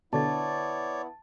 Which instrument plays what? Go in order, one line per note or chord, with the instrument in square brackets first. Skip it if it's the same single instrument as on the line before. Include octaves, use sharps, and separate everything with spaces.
[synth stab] B2 D3 [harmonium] B3 E4 [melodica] C#5 D5 [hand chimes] A5 A6